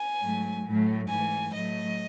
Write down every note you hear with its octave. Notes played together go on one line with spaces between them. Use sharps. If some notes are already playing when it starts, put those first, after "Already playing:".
Already playing: G#5
G#2 F#3 A3
A2 F#3 A3
G#2 E3 A3 G#5
A2 F#3 A3 D#5